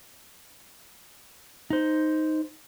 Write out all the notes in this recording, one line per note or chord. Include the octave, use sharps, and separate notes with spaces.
D#4 C5